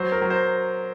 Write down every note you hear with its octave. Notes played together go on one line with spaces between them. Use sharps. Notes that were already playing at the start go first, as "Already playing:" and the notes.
Already playing: F#3 C5
A#4
F#3
C5